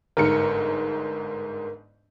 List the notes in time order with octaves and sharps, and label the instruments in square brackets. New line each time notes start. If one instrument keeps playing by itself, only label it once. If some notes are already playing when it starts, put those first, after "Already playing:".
[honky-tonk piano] G1 G#2 C#7 [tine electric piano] A#4